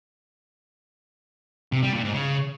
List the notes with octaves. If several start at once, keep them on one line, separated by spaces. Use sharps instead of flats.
C3
G3
A#2
G#2
C#3